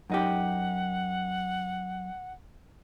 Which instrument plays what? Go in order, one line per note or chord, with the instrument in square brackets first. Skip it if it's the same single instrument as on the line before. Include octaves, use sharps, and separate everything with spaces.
[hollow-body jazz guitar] F#2 D#4 G4 [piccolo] F#5